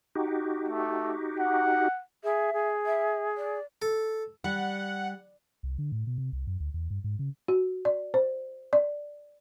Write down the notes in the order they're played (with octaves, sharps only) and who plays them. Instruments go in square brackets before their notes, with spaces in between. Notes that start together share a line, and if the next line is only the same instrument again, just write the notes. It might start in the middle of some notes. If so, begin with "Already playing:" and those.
[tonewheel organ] D#4 F#4 G4
[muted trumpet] A3
F#5
[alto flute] G#4 [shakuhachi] E5
[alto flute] G#4
[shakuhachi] E5
D5
[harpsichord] A4
[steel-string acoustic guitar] G3 [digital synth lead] F#5
[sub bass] C2
D3
A2
B2
C3
C2
F#2
D2
E2
G2
G#2
C#3
[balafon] F#4
D5
C5
D5